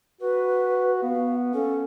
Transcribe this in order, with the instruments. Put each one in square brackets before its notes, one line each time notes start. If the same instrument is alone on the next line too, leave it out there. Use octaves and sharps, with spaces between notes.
[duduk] F#4 [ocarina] B4
[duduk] B3 [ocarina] F5
[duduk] C#4 [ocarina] A4